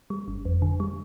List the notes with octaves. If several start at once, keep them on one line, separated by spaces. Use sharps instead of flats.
G3
G1
F2
D3
G3